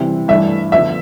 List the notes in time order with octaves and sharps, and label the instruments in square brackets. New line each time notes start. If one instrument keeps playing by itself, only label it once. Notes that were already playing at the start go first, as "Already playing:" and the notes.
Already playing: [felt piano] C3 E3 G3 C4 E4
[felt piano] G2 E3 A3 D4 [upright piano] E5
[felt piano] D3 F3 B3 [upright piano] E5